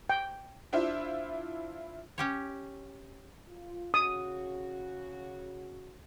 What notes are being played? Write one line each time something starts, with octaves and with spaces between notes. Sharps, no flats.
G5
D4 E4 F4 C5 E5
C#4 G4 C#5
F4
C#3 F#4 D#6